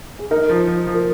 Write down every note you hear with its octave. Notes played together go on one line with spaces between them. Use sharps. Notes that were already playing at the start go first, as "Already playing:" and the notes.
G#4
D#4 A#4
F3
F3
F3
A#4